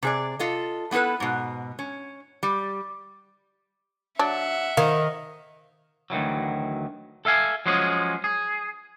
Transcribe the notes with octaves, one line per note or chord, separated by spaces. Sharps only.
C3 G#4 D5
F4 A4 D#5
A3 B3 E4 A4 B4
G#2 B2
C#4
G3
F#3 D4 E5 F#5
D#3 F5
D2 D#3 E3 F#3
A4 E5 F5 G#5
F3 F#3 G#3 C#4 G#4
G#4